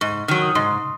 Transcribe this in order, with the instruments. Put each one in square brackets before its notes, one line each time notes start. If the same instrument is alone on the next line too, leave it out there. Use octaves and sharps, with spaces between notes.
[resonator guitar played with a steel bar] G#2 [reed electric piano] C#6
[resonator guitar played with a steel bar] D#3 F#3 [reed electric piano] F6
[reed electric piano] D#6
[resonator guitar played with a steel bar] G#2 [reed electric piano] C6